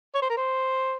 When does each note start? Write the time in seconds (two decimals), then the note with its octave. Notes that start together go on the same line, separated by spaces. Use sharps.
0.15 C#5
0.22 C5
0.30 A#4
0.37 C5